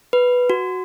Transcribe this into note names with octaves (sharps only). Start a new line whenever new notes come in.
B4
F#4